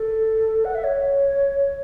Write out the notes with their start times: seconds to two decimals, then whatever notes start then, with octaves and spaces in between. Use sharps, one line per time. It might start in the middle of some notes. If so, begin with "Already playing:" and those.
Already playing: A4
0.65 F#5
0.75 E5
0.84 C#5